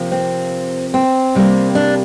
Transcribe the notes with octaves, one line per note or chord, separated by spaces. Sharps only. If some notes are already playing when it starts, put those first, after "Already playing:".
Already playing: C3 F3 A#3
C4
C4
C3 G3 A#3
D4